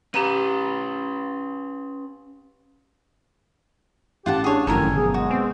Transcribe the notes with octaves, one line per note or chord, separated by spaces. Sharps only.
C#4 G4 B4 A#5 D#7
A1 F4 G4 F#5 A5
D4 G#4 C#5
G1 F#2 A2 D#3 F3 A4 A#4 G#5
B2 F#3 G#4
G#3 F#4
B3 C4